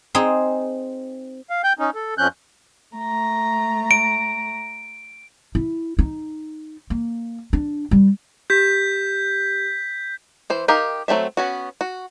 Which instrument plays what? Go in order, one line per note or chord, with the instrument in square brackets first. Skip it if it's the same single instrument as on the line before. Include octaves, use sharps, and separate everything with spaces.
[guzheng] C4 D#4 G#4
[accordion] F5
G5 G6
C#4 D#4
A4
F2 F3 C#4 F#6 G6
[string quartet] A3 A#5
[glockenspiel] D7
[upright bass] E4
D#4
A#3
D4
G3
[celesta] G4 [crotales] G6 B6
[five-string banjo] E3 C5
D#4 G4 A#4 F5
F#3 A3 C4 E5
B3 C#4 F#4
F#4